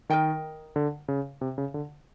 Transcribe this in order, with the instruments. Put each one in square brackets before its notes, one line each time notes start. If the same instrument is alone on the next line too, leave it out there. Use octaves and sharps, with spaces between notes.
[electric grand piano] D#3 [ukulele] A#4 D#5 G5
[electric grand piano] D3
C#3
C3
C#3
D3